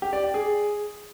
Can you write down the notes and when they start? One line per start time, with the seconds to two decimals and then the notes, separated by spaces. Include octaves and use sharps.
0.02 G4
0.13 D5
0.23 G5
0.34 G#4